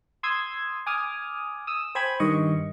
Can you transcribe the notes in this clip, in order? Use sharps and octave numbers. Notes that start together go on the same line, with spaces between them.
C6 D#6 E6 G#6
G#5 D6 D#6 F6
D#6 E6
C5 G5 G#5 B5 G#6
G2 D#3 D#5 C#6